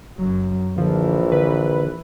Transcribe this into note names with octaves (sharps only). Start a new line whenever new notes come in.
F#1 F#2 F#3
A#1 D3 E3 F3
D3 B4